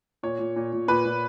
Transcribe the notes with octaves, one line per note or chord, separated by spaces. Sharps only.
A#2 C#5
A#2
A#2
A#2
A#2 B4
A#2